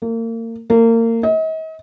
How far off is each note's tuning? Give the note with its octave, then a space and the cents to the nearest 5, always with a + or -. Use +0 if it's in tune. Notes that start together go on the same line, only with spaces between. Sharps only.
A#3 -35
A#3 -30
D#5 +40